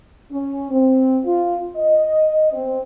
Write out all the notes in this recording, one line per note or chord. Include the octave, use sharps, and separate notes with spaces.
C#4
C4
F4
D#5
C4